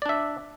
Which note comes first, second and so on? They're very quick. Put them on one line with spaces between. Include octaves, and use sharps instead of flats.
D5 D4 E5